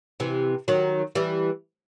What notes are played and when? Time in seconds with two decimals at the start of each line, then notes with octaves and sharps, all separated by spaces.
0.20 C3 E3
0.68 D#3 F#3
1.15 E3 G3